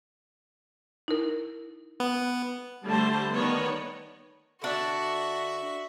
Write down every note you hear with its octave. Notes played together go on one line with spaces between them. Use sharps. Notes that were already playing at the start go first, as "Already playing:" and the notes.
D#4 E4 A#4
B3
D3 G3 A3 C5 A5
D#3 B3 C#5 D5
D3 D4 F#4 D5 E5